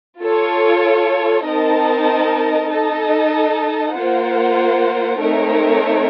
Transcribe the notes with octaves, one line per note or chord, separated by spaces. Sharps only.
F4 A4 C#5
C4 D#4 A#4 D#5 A5
D#4 A4 D#5 A5
A#3 F4 C5 F#5
A3 C4 D#4 A#4 C#5